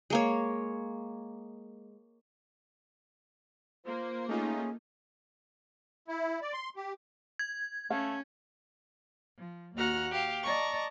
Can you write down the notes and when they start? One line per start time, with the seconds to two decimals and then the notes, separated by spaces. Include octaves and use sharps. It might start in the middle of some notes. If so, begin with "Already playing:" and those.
0.10 G#3 A#3 C#5
3.86 A#3 F4 C5
4.29 A3 C#4 D#4 F4 G#4
6.08 E4
6.42 D5
6.53 C6
6.76 G4
7.39 G#6
7.90 A3 C#4 F5
9.38 F3
9.76 D#2 A#3 F#4 F#5 A#5 F6
10.10 G4 F5
10.43 D5 D#5 A5 A#5 C#6